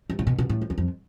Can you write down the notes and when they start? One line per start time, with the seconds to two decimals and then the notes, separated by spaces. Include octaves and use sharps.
0.10 G2
0.19 A2
0.27 B2
0.39 B2
0.50 A2
0.61 F2
0.70 E2
0.78 F2